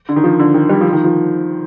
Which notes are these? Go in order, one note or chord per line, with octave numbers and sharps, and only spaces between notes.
D3
D#3
F3
D3
D#3
G3
F3
D#3
F3